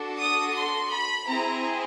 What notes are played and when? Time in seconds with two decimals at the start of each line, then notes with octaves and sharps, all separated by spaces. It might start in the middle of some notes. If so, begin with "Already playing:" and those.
Already playing: D4 F#4 A4
0.18 D#6
0.55 C6
0.91 B5
1.27 C4 E4 G#4 A#5